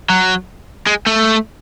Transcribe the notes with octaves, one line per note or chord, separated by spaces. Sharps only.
F#3
G#3
A3